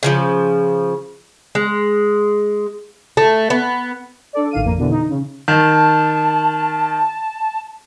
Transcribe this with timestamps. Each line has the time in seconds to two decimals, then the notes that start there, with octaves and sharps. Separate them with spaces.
0.03 C#3 E3 F3
1.55 G#3
3.17 A3
3.50 B3
4.33 D4 A4 D5
4.51 A1 D#3 F5 D#7
4.64 F2 A#3
4.77 B2 D3 E3
4.90 D#4
5.09 C#3
5.48 D#3 A5